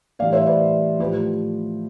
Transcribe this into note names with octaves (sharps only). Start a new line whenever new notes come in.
A2 E3 G3 D5 F5
C5 E5
B4 D5
A2 F3 G4 B4